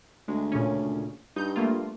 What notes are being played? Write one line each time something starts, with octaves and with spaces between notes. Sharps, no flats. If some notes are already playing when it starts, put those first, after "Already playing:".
D2 G#3
A#2 C#3 C#4
G2 D#4 G6
A3 A#3 F4